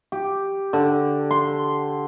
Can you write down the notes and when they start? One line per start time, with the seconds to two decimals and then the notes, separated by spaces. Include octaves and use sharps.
0.12 G4
0.73 D3
1.31 C6